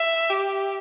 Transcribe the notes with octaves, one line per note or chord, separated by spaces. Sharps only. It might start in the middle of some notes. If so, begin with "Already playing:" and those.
Already playing: E5
G4